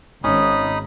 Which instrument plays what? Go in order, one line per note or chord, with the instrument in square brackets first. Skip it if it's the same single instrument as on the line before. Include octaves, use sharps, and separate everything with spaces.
[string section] G#1 [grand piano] C#4 [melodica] D#4 B5 D#6